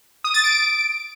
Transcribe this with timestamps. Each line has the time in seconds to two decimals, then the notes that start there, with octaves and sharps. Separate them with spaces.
0.24 D#6
0.34 A6
0.44 D7